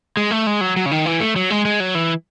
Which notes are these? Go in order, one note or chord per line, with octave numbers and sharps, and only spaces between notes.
G#3
A3
G#3
F#3
F#3
C#3
D#3
E3
A3
F#3
G#3
G#3
F#3
E3